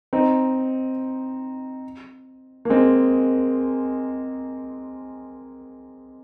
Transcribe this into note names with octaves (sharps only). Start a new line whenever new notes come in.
C4 D#4
A#3
G#3 C4